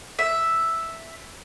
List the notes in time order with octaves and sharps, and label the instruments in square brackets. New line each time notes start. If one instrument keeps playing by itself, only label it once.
[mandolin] E5